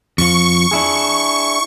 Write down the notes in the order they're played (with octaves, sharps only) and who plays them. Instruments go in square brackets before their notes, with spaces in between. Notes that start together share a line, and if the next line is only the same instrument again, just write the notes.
[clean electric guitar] F2 F3 [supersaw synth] C#6
[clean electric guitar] D4 E4 G#4